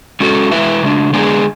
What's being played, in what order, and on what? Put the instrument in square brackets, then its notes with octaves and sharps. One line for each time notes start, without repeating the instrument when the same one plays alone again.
[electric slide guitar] G#3 C#4 F#4 A4
G#3 B3 E4 B4 E5
C#3 G#3 D4
D3 G#3 B3 D4 G#4